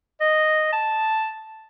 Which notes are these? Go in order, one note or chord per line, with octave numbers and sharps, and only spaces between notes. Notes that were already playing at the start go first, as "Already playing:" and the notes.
D#5
A5